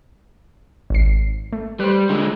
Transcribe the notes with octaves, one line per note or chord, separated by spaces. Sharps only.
G#1 C7
A3
G3 B4 C5
D3 G#3